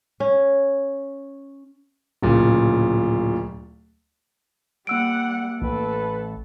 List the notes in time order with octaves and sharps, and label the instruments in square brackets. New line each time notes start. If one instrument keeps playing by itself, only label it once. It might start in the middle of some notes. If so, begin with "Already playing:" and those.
[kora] C#4
[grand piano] D1 A#2 C#3
[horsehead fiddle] G3 F#5 [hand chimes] A#3 E6 D7
[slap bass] A1 A2 [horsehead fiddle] A4 [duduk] B4